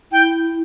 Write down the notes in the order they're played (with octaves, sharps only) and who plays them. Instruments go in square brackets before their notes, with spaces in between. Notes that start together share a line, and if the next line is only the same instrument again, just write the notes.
[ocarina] E4 [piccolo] G5